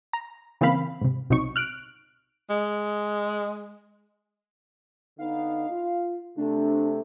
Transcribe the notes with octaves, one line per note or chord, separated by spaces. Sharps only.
A#5
C#3 E3 A#3 C4 F5 B5
G#2 C3
B1 C3 F#3 D#4 C#6
F6 F#6 D7
G#3
D3 B3 D#4 F5
F4
C3 A3 D4